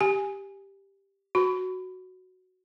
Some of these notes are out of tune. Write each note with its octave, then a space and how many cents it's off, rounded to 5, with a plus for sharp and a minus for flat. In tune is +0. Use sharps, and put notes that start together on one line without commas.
G4 +0 G#5 +0
F#4 +0 B5 +20